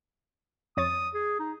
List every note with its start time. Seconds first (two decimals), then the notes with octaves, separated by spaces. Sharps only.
0.77 F2 C#5 D#6 A6
1.14 G#4
1.39 D#4